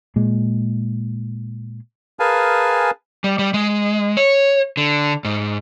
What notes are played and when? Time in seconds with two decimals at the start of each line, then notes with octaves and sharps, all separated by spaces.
0.16 A#2 G#3
2.20 G#4 A#4 B4 F5 G#5 A5
3.24 G3
3.39 G3
3.54 G#3
4.17 C#5
4.77 D3
5.24 G#2